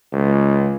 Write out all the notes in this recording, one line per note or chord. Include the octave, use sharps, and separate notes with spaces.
C#2